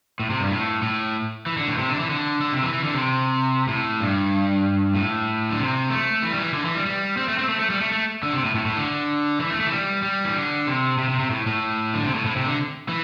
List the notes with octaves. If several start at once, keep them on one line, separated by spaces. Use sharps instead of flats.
A2
C3
G2
A2
A2
E3
D3
A2
C3
D3
E3
D3
D3
C3
E3
E3
D3
C3
A2
G2
A2
D3
C3
A3
E3
G3
E3
D3
E3
G3
G3
C4
A3
C4
A3
A3
G3
A3
A3
D3
C3
A2
A2
A2
D3
E3
A3
A3
E3
G3
G3
E3
D3
C3
C3
C3
C3
A2
A2
D3
C3
A2
A2
C3
D3
E3